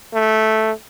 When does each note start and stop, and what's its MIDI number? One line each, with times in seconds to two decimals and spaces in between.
0.14 0.72 57